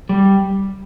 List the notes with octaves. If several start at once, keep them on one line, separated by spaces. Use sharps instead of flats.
G3